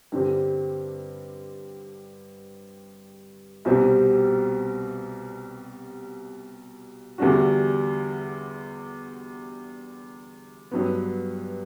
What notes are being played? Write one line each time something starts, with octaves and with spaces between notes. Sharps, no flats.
G2 D3 G3 C4
C2 B2 G3 C4
E2 D3 G3 D4 F#4
G2 F#3 B3